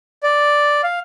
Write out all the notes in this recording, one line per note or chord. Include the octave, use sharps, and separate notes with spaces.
D5
F5